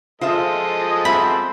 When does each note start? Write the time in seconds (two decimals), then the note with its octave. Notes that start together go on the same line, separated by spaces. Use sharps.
0.21 F3 G#3 F4 A4 C5 D#5 E5
1.05 G3 B3 C4 E5 B5